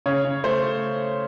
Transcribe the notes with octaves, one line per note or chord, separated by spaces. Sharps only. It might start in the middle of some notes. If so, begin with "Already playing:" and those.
C#3 C#5
C#3
A3 C5